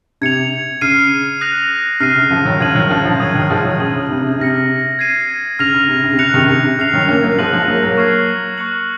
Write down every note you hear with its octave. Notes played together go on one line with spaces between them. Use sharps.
C3 G#6 C#7 F7
C#3 F6 C7 D#7
D#6 F#6 A#6 F7
C3 F6 C7 D#7
C#3
C#3 F3
D#3 F#3
C#3 F3 G#6 D#7 F#7
D#3 F#3
C#3 F3
C#3 F3
D#3 F#3 D#6 G#6 D#7 F#7
D#3 F#3
F3 G#3
D#3 F#3
C#3 F3 D#6 G#6 D#7 F#7
C#3
C3
C3
C#3
C3 F6 A#6 C#7
G#6 C7 D#7
C#3 F6 A#6 F7
C#3
C3
C#3
C3
C#3 F#6 C#7 F7
C3 D#3
C#3
C3
C3
C#3 F6 C7 F7
D#3 F#3
A#3 C#4
F#3 A#3
F3 G#3 F#6 A#6 D#7 F#7
F3 G#3
F#3 A#3
F#3 A#3
C#6 F6 G#6 C7
C#6 F#6 C#7 F#7